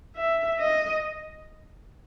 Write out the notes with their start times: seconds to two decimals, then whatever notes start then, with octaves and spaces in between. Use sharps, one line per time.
0.16 E5
0.60 D#5